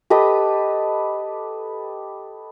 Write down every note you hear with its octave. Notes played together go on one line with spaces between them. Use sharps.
G4 A4 B4 D#5